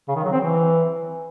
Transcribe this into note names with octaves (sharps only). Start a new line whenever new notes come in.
C#3
D#3
F#3
C4
E3